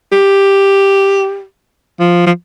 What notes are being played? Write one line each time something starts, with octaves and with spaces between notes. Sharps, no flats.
G4
F3
F3